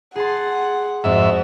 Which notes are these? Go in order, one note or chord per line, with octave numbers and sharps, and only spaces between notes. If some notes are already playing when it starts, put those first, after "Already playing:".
G#4 F#5 A5 C6
F2 G#2 C4 F#4 E5